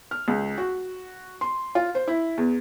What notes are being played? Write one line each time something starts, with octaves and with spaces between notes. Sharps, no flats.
F6
C#2
F#4
C6
F4
C5
E4
E2